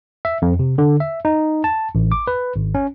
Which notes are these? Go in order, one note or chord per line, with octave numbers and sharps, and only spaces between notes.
E5
F2
C3
D3
E5
D#4
A5
A1
D6
B4
G#1
C#4